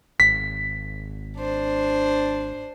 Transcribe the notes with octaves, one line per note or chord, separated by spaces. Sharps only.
G#1 B6
D4 C5